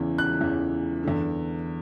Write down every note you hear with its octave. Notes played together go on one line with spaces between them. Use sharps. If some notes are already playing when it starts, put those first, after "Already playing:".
Already playing: E2 C#3 E3
F#6
E2 C#3 E3
E2 D3